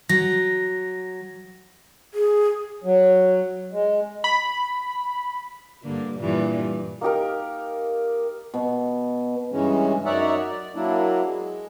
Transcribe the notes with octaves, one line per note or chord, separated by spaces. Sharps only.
F#3 A#6
G#4
F#3
G#3
B5
G2 D3 A#3
G2 A#2 E3
A#3 D#4 G4 A#4
B2
G2 C#3 E3 G#3 C#4
F#2 D#4 C#5 D5 E5 F#5
D5
F#3 A#3 D4 E4
G#3